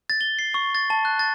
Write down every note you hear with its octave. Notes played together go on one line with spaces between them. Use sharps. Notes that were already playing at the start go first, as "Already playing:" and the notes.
A6
G7
C7
C#6
A6
A5
F#6
A6